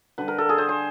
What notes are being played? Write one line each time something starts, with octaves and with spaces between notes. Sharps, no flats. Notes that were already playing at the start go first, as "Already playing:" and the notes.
D3 G3 B4
A#4
A4
G#4
C5
C5